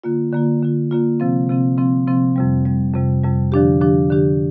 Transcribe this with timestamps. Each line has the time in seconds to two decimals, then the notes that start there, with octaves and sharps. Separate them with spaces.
0.04 D3 A#3 F4
0.33 D3 A#3 F4
0.62 D3 A#3 F4
0.91 D3 A#3 F4
1.20 C3 F3 C4
1.49 C3 F3 C4
1.78 C3 F3 C4
2.07 C3 F3 C4
2.36 F2 C3 G3
2.65 F2 C3 G3
2.94 F2 C3 G3
3.24 F2 C3 G3
3.52 D3 F3 D4 G4
3.81 D3 F3 D4 G4
4.10 D3 F3 D4 G4